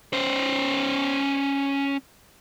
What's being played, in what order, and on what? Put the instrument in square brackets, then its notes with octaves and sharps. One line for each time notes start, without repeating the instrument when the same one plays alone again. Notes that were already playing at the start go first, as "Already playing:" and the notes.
[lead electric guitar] C#4 C5